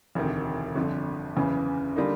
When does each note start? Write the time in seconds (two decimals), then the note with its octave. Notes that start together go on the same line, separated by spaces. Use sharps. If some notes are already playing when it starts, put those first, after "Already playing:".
0.15 E1 D2 C3 D#3
0.75 G1 F2 D3
1.36 F#1 E2 C#3 E3
1.96 D3 G3 A#3 D#4